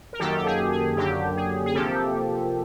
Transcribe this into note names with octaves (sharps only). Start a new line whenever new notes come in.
A#4
F#2 D#3 F#3 A#3 G4 A4
G4
G#4
G#4
F#2 D3 F#3 A#3 G4
G#4
G#4
C3 F3 A#3 G4 A4